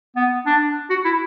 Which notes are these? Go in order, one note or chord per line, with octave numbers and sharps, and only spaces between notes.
B3
D4
F#4
E4